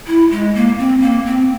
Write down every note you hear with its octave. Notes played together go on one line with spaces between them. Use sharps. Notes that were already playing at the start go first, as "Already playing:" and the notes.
E4
G#3
A#3
C4
A#3
C4